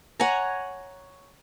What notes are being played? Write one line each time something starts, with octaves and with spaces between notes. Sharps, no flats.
C#5 F#5 G#5 A#5